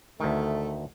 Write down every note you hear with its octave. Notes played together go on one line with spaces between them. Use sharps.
D2 D#3 A3